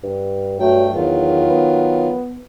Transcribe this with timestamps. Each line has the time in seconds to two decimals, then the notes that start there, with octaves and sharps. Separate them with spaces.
0.03 G2
0.60 G2 F#3 A3 G5
0.94 E2 D#3 F#3 F4
1.49 B3